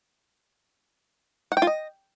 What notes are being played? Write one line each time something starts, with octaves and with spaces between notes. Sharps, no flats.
F#5
G5
F4
D#5